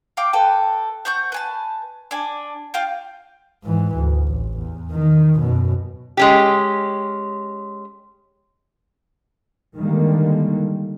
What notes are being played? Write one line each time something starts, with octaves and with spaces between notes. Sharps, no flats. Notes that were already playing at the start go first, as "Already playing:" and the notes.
F5 G5 D6
A4 B4 G5
C5 F#5 C#6 G6
B4 G#5 A5
D4 G#5
F4 F5 G5
G#2 E3
D2
A1
E2
D#3
F#2 B2
G#3 C#4 G4
D3 D#3 G3 G#3 A#3